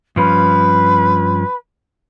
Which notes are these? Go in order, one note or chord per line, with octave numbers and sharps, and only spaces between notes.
G2 F3 C#4 B4